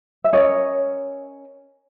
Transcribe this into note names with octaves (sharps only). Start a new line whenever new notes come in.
E5
C#4 F4 A#4 C#5 D#5